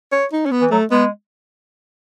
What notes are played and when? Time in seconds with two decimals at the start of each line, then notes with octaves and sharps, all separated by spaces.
0.12 C#5
0.32 D#4
0.46 C#4
0.51 B3
0.61 E3
0.70 F#3 A3
0.91 G#3 B3